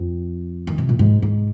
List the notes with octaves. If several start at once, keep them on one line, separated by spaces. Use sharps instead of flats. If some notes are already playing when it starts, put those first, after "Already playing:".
Already playing: F2
D#3
C3
A#2
G#2
G#2